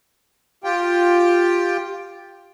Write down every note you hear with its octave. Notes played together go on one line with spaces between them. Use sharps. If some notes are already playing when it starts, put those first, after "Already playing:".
F4 G4 G5